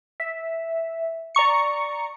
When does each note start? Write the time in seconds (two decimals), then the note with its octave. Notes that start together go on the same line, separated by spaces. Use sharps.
0.20 E5
1.35 D5 A#5 C#6 C#7